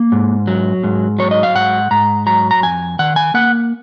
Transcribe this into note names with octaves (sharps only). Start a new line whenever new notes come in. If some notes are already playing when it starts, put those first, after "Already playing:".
Already playing: A#3
G#2
F#3
G#2
F#3 C#5
D#5
F5
G#2 F#5
G#2 A#5
F#3 A#5
A#5
F2 G#5
D#3 F#5
G#5
A#3 F#5